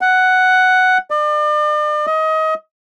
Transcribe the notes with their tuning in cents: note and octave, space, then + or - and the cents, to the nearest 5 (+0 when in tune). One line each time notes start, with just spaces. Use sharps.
F#5 +5
D5 +40
D#5 +25